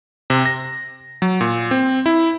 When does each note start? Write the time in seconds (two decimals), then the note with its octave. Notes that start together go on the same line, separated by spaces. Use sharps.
0.30 C3
0.46 A#6
1.22 F#3
1.41 A#2
1.71 C4
2.06 E4